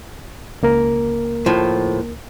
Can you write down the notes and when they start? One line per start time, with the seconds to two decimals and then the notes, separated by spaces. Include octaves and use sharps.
0.63 C#2 A#3 A#4
1.46 A2 F3